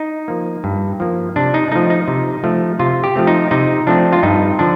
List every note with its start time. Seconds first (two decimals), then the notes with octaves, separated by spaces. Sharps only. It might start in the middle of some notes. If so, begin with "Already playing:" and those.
Already playing: D#4
0.28 F3 A#3
0.64 G2
1.00 F3 A#3
1.36 C3 D4
1.54 D#4
1.72 F3 A3 D#4
1.90 D#4
2.08 C3
2.44 F3 A3
2.79 C3 F4
3.04 G4
3.16 F3 A3 C4
3.27 D#4
3.51 C3 D#4
3.87 F3 A3 C4 D4
4.12 F4
4.23 G2 D#4
4.59 D3 F3 D4